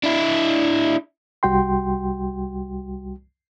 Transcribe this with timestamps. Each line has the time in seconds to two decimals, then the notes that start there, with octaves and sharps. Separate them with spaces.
0.03 D4 E4
1.43 C2 G3 F#4 G5 C6